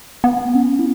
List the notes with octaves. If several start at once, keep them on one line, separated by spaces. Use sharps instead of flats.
B3
C#4
E4